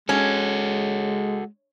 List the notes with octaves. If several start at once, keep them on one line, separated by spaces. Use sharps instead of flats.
G#3 C#4 F#4 A4